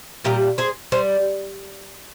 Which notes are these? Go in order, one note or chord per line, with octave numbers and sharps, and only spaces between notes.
A#2 G3 G4 A#4
G#4 C5
G3 C5